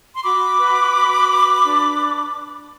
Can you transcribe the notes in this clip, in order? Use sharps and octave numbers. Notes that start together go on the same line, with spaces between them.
C6
F#4 B5 D6
B4
F#4
B4
D4